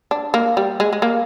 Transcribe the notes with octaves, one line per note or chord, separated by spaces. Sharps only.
D4
A#3
G3
G#3
G#3
A#3